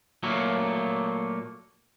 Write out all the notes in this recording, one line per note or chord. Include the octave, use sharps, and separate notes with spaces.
A#2 F#3 A3 A#3